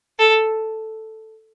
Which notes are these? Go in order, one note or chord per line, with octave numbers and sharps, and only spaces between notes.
A4